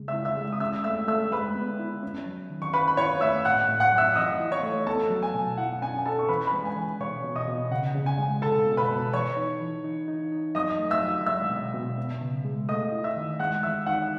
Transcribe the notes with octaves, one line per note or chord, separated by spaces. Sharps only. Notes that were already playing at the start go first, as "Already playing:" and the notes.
Already playing: C#3 G#3
E5 E6
E4
E5 E6
G#3
D#6
C#4 E5 E6
A3 E5 E6
A3 E5 E6
G#3 B4 B5
B3
E4
C#4
F#3
D#3
C#6
C#4 B4 B5
B5
E4 C#5 C#6
A3 E5 E6
A2 F#5 F#6
A2
F#5 F#6
F#3
E5 E6
E3 D#5 D#6
E4
C#5 C#6
A3
B3 A4 A5
F#3
G#5
B2
E4 F#5
C#4 G#5
C#4 A4 A5
C#6
E3 B4 B5
B4 B5
G#3
G#5
E3
B2 C#5 C#6
B2
D#5 D#6
B2
C#3 F#5
C#3
G#5
G#3
B2 A4 A5
B2
B4 B5
B2
E3 C#5 C#6
D#4
E3
D#4
D#4
D#4
F#3 D#5 D#6
A3
E5 E6
F#3
G#3 E5 E6
B2
B2
B3
C#3
G#3
A3 D#5 D#6
E4
E5 E6
D#3
G#3 F#5 F#6
E3 E5 E6
D#4 F#5 F#6